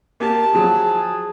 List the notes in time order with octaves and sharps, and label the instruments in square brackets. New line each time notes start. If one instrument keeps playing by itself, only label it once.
[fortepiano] A#3 G4 [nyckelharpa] A5
[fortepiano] F3 F#3 [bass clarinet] G#4